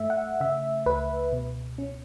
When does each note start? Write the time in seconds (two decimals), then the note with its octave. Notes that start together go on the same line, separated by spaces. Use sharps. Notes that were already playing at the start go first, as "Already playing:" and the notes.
Already playing: G2 A3 E5
0.10 F#5
0.40 C#3 E5
0.86 C#2 B4
1.32 B2
1.78 C#4